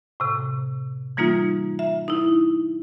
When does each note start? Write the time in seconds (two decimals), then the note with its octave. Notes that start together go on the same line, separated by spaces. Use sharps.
0.20 A2 C3
1.17 E3 G3 A#3 D#4 F4
1.79 E5
2.08 D#4 E4